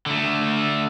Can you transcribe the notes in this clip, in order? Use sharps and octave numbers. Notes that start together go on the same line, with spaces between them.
D3 A3